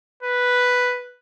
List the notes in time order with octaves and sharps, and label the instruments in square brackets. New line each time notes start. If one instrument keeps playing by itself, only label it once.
[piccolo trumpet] B4